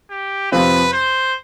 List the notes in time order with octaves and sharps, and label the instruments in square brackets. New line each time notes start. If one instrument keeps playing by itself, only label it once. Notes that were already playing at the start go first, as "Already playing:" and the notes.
[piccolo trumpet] G4
[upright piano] F2 C3 F3 C4 F4 [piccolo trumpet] B4
[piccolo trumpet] C5